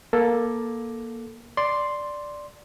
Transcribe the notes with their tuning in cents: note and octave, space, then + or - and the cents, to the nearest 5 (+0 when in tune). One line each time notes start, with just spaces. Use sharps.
A#3 +15 A4 +5
D5 +0 C6 +0